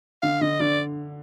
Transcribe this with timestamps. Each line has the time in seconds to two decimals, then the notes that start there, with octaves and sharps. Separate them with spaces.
0.22 D3 F5
0.41 D3 D#5
0.60 D3 D5